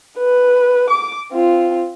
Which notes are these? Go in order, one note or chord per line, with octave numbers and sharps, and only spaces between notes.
B4
D6
C4 F4